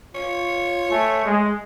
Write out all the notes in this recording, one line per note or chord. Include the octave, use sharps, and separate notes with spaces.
F4 C#5
A3 G#5
G#3